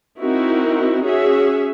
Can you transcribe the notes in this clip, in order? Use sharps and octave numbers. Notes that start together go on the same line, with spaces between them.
C4 D#4 E4 F#4 A#4
C#4 F#4 G#4 E5